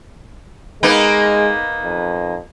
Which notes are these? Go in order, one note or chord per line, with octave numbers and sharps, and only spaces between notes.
G#3 A#3 B3 D#4
F2